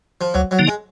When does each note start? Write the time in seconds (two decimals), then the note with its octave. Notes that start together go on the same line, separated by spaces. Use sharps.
0.21 F3
0.34 D2 F#3
0.51 F#3
0.59 D3 F3 A#3 D#4
0.67 G#3